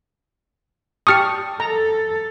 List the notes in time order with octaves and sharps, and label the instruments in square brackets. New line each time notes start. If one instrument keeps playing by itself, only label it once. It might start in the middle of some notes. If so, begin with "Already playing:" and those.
[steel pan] G4 A5 C#6 [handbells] D#6 F6 C#7
[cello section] A4 [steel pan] A#5